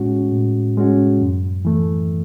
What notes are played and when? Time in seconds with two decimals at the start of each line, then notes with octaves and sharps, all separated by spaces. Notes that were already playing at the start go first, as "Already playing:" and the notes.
Already playing: A2 G#3 C#4 F#4
0.32 A2
0.77 G#3 C#4 F#4
1.21 F#2
1.65 E3 A3